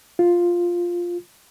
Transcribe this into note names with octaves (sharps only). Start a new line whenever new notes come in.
F4